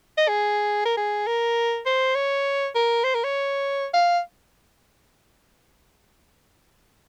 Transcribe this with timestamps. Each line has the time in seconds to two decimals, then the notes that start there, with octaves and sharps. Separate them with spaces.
0.17 D#5
0.28 G#4
0.85 A#4
0.97 G#4
1.26 A#4
1.86 C5
2.15 C#5
2.75 A#4
3.04 C5
3.14 A#4
3.24 C#5
3.93 F5